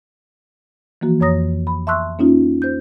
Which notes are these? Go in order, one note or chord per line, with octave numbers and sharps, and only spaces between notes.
E3 F3 A#3 F#4
F2 C#5 A#5 D#6 A#6
B5
E5 A5 C6 C#6 E6 F#6
A#3 C#4 D#4 F4
C5 G6